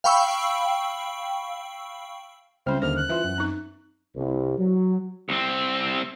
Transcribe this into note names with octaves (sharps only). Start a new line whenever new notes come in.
F5 G5 B5 C#6 E6
C#2 G3 C4 C#4 C5 F6
D#2 D3 D#3 C5 F6
F#6
E3 F4 C5 E5
F#2
C4 D#4
C2
F#3
C2 C4